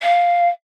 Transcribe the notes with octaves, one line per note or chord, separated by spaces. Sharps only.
F5